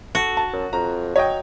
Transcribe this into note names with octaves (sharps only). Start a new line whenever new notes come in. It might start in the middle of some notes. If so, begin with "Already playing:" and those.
F#4 A4
A5
F#2
F2 A#5
F#3 C#5 D#5 G5